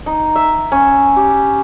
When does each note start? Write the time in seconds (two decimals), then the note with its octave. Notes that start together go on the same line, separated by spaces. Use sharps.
0.06 D#4
0.36 E5
0.72 C#4
1.17 G4